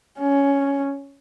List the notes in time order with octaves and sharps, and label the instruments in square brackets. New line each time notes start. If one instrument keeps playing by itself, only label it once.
[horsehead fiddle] C#4